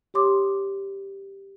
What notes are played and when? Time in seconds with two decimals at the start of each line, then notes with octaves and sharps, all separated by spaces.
0.14 G4 C#5 C6 D6 D#6